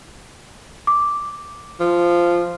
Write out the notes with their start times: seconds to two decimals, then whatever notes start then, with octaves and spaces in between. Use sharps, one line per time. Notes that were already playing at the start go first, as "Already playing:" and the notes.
0.87 D6
1.80 F3